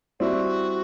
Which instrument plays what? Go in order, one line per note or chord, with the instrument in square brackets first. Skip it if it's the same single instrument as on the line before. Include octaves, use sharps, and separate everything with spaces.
[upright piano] G3 C4 E4 [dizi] F#4